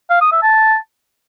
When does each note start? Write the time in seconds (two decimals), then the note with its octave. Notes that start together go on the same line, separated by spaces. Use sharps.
0.10 F5
0.21 D#6
0.32 E5
0.43 A5